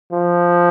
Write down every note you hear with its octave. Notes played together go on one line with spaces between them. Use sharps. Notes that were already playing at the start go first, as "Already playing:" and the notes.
F3